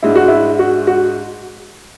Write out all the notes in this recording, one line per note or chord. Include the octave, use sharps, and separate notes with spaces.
G#2 G#3 D4 E4
F#4
E4
F#4
F#4